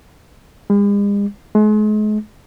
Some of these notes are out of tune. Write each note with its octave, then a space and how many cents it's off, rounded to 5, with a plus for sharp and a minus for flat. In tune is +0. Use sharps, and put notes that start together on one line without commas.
G#3 -45
G#3 +40